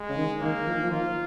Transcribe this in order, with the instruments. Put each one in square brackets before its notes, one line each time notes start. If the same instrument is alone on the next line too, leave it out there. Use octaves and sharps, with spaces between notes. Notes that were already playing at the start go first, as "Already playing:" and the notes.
Already playing: [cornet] G#3
[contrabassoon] C#3
D#3
[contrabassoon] D#3 [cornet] A#3
[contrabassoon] F3
D#3
F3
[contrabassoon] D#3 [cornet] F4